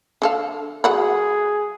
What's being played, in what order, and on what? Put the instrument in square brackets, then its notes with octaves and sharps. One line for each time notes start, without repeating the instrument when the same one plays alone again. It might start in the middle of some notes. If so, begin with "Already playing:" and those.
[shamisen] D3 A4 F5
[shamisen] F#3 F#5 B5 [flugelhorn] G#4